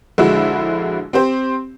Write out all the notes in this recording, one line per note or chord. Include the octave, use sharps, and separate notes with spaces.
A#1 D3 G#3 E4 F#4 E6
C4 G4 C5